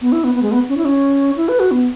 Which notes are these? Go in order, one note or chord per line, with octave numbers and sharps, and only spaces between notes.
B3
E4
B3
B3
G#3
B3
C#4
E4
C#4
E4
B4
F#4
B3